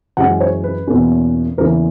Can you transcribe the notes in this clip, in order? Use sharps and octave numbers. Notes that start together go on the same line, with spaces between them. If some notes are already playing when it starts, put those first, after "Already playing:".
F#2 E3 G#3 C#4 F#5
C#5
B4
E2 B2 A#3 C#4
E2 C#3 E3 A#3 C#4 A#4